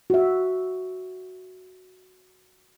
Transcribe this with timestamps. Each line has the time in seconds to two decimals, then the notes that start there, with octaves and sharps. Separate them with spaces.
0.10 F#4 E5